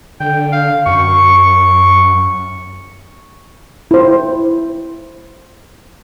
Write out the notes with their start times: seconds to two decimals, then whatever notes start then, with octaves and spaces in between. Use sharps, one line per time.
0.20 D3 G5
0.53 F5
0.86 F#2 C#6
3.91 E4 C5